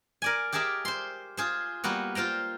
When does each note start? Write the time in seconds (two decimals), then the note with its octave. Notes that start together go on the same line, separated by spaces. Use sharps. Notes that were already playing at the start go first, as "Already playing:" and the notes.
0.22 A#4 D5 G#5
0.53 G4 G#4 A#4 D5 E5
0.85 C5 C6
1.37 F4 G#4 C5
1.84 G3 A#3 B3 F#4
2.15 F4 C5 G5 A#5